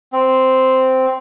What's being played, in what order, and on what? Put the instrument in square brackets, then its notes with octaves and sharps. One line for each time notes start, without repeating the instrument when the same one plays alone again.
[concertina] C4